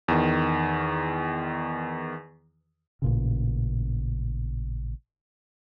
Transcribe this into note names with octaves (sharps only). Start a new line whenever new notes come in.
E2 D#3
A1 A#2 C#3